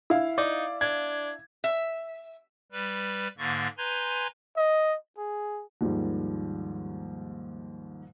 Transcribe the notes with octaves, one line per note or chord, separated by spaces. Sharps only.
E4 F5
D#4 D5
D4 G#6
E5
G3 B4
G#2 D3 A#3 C#6 A6
B4 G#5 A#5 C6 G6 G#6
D#5
G#4
D#2 G#2 D#3 F3 G3